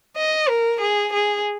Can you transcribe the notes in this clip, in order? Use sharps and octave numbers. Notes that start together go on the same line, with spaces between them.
D#5
A#4
G#4
G#4